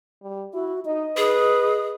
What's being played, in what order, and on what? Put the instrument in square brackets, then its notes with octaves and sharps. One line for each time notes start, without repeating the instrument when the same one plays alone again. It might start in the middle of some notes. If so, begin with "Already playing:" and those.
[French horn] G3
[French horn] E4 [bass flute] F#4
[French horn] D#4 [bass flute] D#5
[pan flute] G#4 [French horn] B4